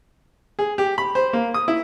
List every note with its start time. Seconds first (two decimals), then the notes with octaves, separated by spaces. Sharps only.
0.59 G#4
0.78 G4
0.98 B5
1.15 C5
1.33 A#3
1.54 D#6
1.68 E4